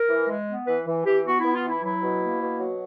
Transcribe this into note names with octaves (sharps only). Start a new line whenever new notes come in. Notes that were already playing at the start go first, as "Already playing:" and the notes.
Already playing: A#4
E3
G#3
B3
E3 B4
E3
E3 G4
B3 F#4
B3 E4
F4
E3
E4
F#3 E4
B2
A#3
B2
F#3